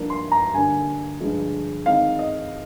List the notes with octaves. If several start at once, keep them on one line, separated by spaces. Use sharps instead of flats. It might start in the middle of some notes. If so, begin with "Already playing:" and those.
Already playing: G2 F3 A#3 D4
C6
A#5
D3 G3 A#3 D4 G#5
G2 D3 F3 G#3 D4
D#3 G#3 C4 D#4 F5
D#5